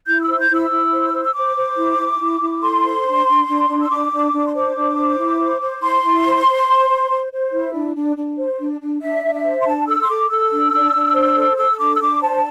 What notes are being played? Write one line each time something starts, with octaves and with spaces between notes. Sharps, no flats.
E4 G6
E6
C5
G6
E4 E6
E4
C5
C5
E6
C5 D6
C5
E4
E4
E4
E4
A4 C6
C5
D4
D4
D4
D4
E6
D4 D6
D4
D4
C6
C5 D6
D4
C5
E4
C5
C5
E4 C6
E4
C5
C5
C5
C5
C5
C5
E4
D4
D4
D4
C5
D4
D4
D4 E5
D4
E5
C5
C6
D4 A5
A4 E6
C6
A4 D6
A4 E6
D4
D4
D4
C5
A4
A4 E6
D4 D6
E6
D4 D6
C5 A5